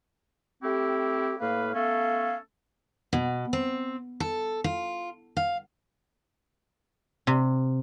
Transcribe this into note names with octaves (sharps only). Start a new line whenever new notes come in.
A3 C4 E4 G4
A2 A#3 B4 F5
A3 B3 C#4 A4 F5
B2
C4
A4
F4
F5
C3